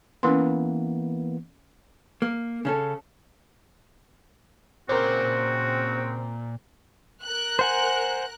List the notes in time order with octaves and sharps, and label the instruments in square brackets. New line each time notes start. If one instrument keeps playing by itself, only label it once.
[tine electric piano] E3 A#3 B3 [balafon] C#4 C6
[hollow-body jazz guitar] A#3
C#3 C#4 A4
[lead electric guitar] A#2 [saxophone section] C#3 C4 [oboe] F#4 [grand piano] A#4 C5
[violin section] A#4 F#6
[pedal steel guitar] C5 F#5 G#5